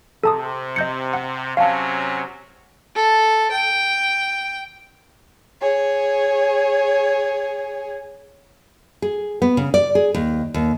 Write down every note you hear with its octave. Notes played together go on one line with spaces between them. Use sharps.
C3 A4 A5 D#6
D#5 G6 C#7
F#5
C3 F#3 C#4 F5 A5
A4
G5
G#4 C#5
G#4
B3
C#3
D5
G#4
D#2
D#2